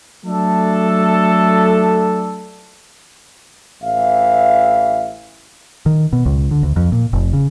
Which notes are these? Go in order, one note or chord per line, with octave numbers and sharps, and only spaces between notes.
F#3 A3 D4 A4
A1 E3 E5 F5
D#3
B2
C#2
D3
D2
F2
A#2
F1
C#3